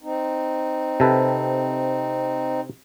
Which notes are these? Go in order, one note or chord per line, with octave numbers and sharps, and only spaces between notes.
C4 D#4
C3 A4 B4